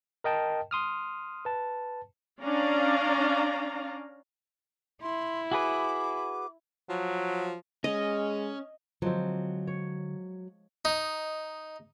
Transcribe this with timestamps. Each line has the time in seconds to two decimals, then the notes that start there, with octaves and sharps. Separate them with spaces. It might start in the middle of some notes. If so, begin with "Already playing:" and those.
0.24 A#4 D#5 G5 A5
0.71 C6 D#6 F6
1.45 B4 A5
2.42 C#4 D4 D5 F5 A#5
5.02 E4 C6
5.52 F#4 G#4 B4 D6
6.89 F3 F#3
7.84 G#3 C#4 D#5
9.02 D3 F3 F#3 G#3 C4
9.67 C#5
10.85 D#4